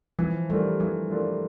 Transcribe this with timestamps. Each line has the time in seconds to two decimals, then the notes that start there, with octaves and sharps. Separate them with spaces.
0.19 E3 F3
0.50 G3 A3 D4 F4 A#4
0.80 E3 F3
1.10 A3 D4 F4 A#4